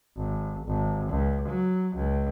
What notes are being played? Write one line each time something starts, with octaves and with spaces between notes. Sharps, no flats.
G#1
G#1
C#2
F#3
C#2